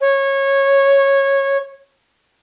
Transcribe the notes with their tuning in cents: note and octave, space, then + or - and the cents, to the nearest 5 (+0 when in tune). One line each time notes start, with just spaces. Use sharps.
C#5 -15